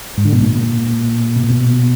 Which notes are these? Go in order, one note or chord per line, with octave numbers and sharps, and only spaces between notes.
G#2
D3
B2
A#2
B2
A#2
B2